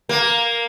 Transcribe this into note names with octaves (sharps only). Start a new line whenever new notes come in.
A#3